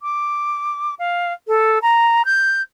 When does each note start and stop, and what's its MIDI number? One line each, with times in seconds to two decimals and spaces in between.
0.02 0.95 86
0.99 1.33 77
1.48 1.78 69
1.82 2.22 82
2.25 2.62 91